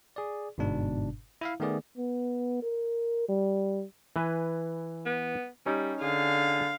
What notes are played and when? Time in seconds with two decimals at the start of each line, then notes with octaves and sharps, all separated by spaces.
0.16 G#4 D5
0.58 G1 G#2 B2 D4
1.41 E4 E5 F5
1.60 D#3 A3 B3 G#4 D5
1.98 B3
2.62 A#4
3.29 G3
4.16 E3 B4 G#5
5.06 B3
5.66 G3 C#4 D#4
6.01 D3 G#4 F5